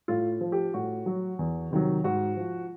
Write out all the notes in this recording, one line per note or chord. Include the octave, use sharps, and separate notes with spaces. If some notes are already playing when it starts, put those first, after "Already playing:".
A2 F4
F3
G4
A2 F#4
F#3
E2
C3 D#3 F#3
G#2 F#4
F3